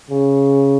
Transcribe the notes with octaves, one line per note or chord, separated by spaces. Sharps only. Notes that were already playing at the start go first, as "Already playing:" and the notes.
C#3